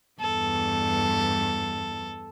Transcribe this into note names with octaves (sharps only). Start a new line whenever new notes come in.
E2 G2 A4